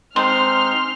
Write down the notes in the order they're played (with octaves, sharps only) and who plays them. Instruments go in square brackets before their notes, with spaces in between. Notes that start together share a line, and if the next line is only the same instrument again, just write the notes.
[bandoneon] G#3 C4 D#4 [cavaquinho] C5 [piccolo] C6 [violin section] F6